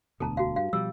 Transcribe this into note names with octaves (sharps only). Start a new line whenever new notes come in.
E1 D2 B2 A4 A5 A#5
F#4 F5
G2 F5
B2 F3 G3 E6